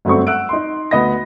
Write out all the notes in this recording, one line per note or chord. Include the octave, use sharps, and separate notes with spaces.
G1 F#3 A3 C4 C#6
F#5 E6 F#6 D7
D#4 C6
D2 B3 D#5 B5 A#6